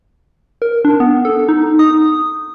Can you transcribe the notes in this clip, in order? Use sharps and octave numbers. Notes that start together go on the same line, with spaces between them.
A#4
D4
B3
A4
D#4
D#6